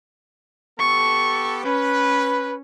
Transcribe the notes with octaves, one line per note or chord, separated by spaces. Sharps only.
B3 G4 A4 C#6
C#4 B4